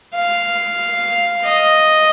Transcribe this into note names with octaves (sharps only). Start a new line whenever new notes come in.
F5
D#5